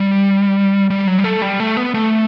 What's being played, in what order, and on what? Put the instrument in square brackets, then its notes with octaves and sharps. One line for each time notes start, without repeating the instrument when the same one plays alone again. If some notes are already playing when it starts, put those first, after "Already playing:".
Already playing: [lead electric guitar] G3
G3
F#3
G3
A3
G3
A3
B3
A3